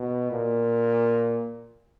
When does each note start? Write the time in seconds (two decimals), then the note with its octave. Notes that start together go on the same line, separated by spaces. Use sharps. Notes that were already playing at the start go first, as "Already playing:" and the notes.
Already playing: B2
0.31 A#2